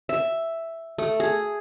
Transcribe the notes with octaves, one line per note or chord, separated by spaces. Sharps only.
E5
A3
G#4